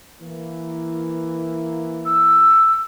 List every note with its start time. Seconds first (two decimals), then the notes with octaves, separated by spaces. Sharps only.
0.20 E3 A#3
2.05 E6